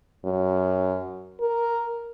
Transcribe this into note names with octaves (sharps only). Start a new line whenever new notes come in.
F#2
A#4